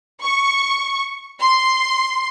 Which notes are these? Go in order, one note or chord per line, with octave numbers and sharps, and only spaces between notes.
C#6
C6